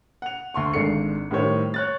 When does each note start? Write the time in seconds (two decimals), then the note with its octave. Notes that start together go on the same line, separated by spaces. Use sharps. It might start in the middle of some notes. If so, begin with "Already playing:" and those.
0.22 F#5 F7
0.54 D2 C6 C#6
0.74 G#1 G#2 D4 A4 C7 C#7
1.31 A2 D#3 G3 C5 C#5
1.74 C#5 F#6 A6